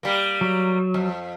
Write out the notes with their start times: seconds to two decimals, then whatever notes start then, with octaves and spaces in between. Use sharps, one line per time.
0.03 G3 A#3
0.41 F#3
0.94 F2